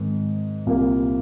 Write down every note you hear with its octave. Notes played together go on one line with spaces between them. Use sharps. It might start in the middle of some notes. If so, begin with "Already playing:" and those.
Already playing: G#2 D#3 C4
C2 A#2 A#3